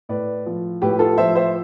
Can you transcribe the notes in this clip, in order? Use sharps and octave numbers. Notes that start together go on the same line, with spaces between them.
A2 B4 D5
F3
A2 G4 B4
F4 A4
F3 C5 E5
C5 E5